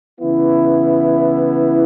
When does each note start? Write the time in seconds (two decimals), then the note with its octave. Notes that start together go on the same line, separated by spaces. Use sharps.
0.20 C#3 E3 B3 E4